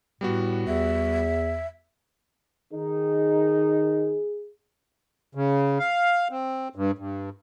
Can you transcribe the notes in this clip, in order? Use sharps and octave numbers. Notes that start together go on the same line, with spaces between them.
A2 G3 B3 F#4
E2 E5
D#3 D#4 G#4
C#3
F5
C4
G2
G2